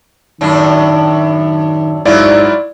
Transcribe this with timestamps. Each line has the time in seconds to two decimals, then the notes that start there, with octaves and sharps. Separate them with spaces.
0.41 F#2 A2 D#3 D4
2.05 G#2 F#3 E4 F4 D5